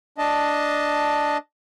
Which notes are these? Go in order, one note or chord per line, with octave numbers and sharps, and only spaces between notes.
D4 D#5 A5